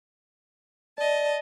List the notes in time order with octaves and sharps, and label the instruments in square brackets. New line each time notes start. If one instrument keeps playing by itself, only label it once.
[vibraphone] D5 [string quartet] D#5 A5